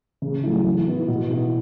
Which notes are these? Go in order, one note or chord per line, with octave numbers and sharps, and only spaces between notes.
C#3
F#3 A3 E4
E3
B3 E4
B2
B3 E4